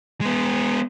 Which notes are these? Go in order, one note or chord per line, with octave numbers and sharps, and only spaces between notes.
G#3 B3